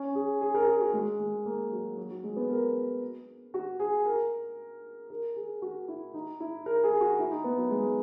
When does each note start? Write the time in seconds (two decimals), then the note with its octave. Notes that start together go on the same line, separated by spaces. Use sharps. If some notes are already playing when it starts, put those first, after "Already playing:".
Already playing: C#4
0.15 G#4
0.41 G#4
0.54 A#4
0.67 G#4
0.81 F#4
0.93 G#3
1.20 G#3
1.45 A#3
1.71 F#3
1.97 F#3
2.10 F#3
2.24 G#3
2.37 B3
2.50 A#4
3.54 F#4
3.79 G#4
4.06 A#4
5.10 A#4
5.36 G#4
5.62 F#4
5.88 E4
6.14 D#4
6.40 E4
6.66 A#4
6.83 G#4
7.00 F#4
7.19 E4
7.31 D#4
7.44 B3
7.57 F#3
7.70 G#3